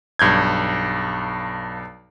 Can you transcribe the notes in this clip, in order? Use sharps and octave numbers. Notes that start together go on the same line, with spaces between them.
B1 G2 G6 G#6